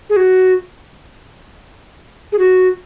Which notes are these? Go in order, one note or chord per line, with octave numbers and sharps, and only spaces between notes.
G#4
F#4
G#4
F#4